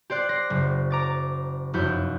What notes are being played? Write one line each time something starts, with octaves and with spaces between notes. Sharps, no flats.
G4 C5 D5 F#6
C5 A#6
F#1
A#5 D6 A6
F1 F#2 E4 F#4 G6